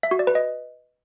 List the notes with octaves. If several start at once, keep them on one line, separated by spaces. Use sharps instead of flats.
E5
F#4
D5
B4
D#5